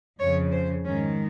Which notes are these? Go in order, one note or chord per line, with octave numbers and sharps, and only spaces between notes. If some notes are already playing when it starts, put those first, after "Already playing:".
F2 C#3 C#5
C5
G#2 D#3 C#4